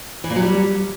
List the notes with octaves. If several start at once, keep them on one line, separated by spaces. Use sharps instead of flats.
E3
A#2
F#3
G3